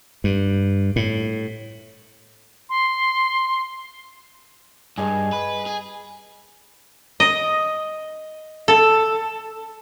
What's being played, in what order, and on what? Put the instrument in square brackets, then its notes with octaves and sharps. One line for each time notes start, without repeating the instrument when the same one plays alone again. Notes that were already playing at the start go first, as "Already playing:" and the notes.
[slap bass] G2
A2
[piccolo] C6
[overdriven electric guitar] G2 [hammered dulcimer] G#4 D#5
[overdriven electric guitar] B4
G#4
[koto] D#5
A4